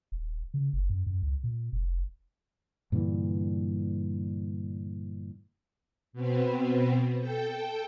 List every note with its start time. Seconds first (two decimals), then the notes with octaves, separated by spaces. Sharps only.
0.12 D#1
0.54 C#3
0.73 F#1
0.90 F#2
1.07 F#2
1.22 C#2
1.44 A#2
1.72 F1
2.92 G2 A#2 D3 E3
6.13 B2 B3 C4
7.18 A4 G5